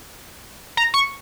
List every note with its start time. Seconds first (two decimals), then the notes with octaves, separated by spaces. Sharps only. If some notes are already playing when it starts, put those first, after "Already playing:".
0.77 A#5
0.94 C#6